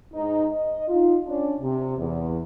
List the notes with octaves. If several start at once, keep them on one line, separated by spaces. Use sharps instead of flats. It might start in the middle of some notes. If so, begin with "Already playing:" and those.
G#2 D#4
D#5
D#4 F4
C#4 D4
C3
E2